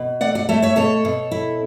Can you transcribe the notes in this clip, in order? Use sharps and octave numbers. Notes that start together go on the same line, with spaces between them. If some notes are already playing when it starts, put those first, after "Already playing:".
Already playing: B2
A3 D5 F#5
D5 F#5
A3 C#5 E5
C#5 E5
B2 A4 C#5
B2
E4